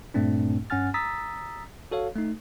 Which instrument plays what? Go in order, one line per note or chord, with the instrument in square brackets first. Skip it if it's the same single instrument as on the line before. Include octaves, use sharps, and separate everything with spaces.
[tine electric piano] G2 A#2 A3 C4 D4
G2 C#4 F#5 G#5 F6 A6
A#5 D#6 E6 A6 B6
F#4 A4 C#5 F5
A3 D#4